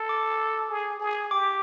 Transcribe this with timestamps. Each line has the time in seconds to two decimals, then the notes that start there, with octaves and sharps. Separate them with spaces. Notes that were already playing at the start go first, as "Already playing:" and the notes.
Already playing: A4
0.09 D6
0.70 G#4
1.00 G#4
1.31 G4 D6